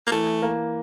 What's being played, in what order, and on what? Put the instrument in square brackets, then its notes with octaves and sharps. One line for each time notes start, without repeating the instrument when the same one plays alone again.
[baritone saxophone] A#3
[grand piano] E3 [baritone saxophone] A3
[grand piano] A#3